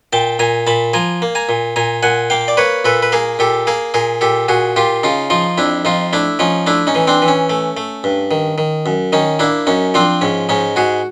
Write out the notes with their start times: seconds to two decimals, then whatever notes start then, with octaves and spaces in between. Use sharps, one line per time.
0.13 A#2 G5 A5
0.39 A#2 G#5 A#5
0.67 A#2 A5 B5
0.94 F3 G#5 A#5
1.22 A#3
1.35 G#5 A#5
1.49 A#2
1.76 A#2 G#5 A#5
2.03 A#2 F#5 G#5
2.30 A#3 F5 G5
2.48 D5
2.57 A#3 B4 C#5
2.85 A#2 A4 B4
3.02 B4
3.12 A#3 G#4 A#4
3.39 A#2 G4 A4
3.67 A#3 G#4 A#4
3.94 A#2 G#4 A#4
4.21 A#2 G4 A4
4.48 A#2 F#4 G#4
4.76 A#2 F4 G4
5.03 C#3 D#4 F4
5.30 F3 D#4 F4
5.58 F2 D4 E4
5.85 F2 D#4 F4
6.13 A3 D4 E4
6.39 F3 C#4 D#4
6.66 A3 D4 E4
6.87 C#4 D#4
6.95 E3
7.07 C4 D4
7.22 E3
7.28 C#4
7.50 A3
7.77 A3
8.04 G2
8.31 D#3
8.58 D#3
8.86 F#2
9.13 D#3 C#4 D#4
9.39 A#3 D4 E4
9.67 F#2 C#4 D#4
9.94 F3 C4 D4
10.21 G#2 C#4
10.49 G#2 C#4 D#4
10.76 G#2 F#4 G#4